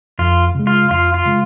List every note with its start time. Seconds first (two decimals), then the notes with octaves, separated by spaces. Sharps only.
0.19 F2 F4
0.55 C#3 G#3
0.67 F4
0.91 F2 F4
1.14 F4
1.26 C#3 G#3